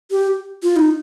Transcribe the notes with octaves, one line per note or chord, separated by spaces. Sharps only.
G4
F4
D#4